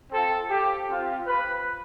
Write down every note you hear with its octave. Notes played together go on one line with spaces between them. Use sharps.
C4 F4 A4
G4
C4 F4
B4